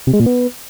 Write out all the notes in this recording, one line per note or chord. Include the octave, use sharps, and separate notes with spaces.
C3
G#3
A#2
B3